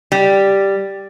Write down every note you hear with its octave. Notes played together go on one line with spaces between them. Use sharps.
G3